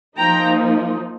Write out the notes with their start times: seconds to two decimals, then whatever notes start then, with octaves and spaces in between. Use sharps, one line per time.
0.16 F3 A#3 D#4 G5 A#5